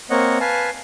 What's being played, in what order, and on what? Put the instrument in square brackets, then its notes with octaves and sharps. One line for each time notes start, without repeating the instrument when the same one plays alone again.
[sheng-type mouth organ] A#3 C4 C#5 D#5 F#5
B4 F5 G#5 A5